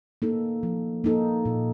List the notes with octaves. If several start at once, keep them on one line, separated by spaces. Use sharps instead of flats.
A#3 D#4 A4
F3
A#3 D#4 A4
A#2